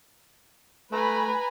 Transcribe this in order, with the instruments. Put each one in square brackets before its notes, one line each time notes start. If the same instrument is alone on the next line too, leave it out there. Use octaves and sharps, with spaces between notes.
[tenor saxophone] A3 [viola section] B4 B5 [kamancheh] G#5 A#5